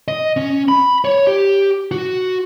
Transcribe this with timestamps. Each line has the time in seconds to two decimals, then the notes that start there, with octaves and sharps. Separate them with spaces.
0.08 D#5
0.37 C#4
0.68 B5
1.05 C#5
1.27 G4
1.91 F#4